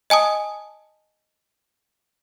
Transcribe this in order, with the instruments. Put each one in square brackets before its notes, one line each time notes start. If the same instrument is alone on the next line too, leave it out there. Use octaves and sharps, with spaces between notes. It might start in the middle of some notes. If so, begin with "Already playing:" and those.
[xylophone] D#5 G#5 A5 D#6